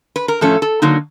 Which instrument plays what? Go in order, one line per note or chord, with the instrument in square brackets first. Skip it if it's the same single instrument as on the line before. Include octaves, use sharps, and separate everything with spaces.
[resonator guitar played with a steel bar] B4
A#4
A2 F3 A3 C#4 A4
A4
D3 F#3 A#3 D#4